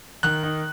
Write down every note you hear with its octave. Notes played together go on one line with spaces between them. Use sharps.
D#3 F#6
D#4